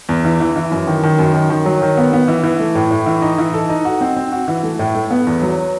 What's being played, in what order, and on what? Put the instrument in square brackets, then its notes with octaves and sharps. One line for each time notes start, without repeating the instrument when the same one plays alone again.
[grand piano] E2
E3
E3
E3
F#2
D#3
D#3
F#2
D#3
D#3
F#3
D#3
B3
B3
E3
E3
A3
A2
A2
E3
D#4
E3
A4
D#4
F#4
C4
C4
F#4
E3
A3
A2
A3
B3
E2
F#3